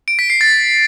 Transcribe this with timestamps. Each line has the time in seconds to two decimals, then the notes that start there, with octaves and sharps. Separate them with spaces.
0.08 D7
0.19 B6
0.30 C7
0.41 A6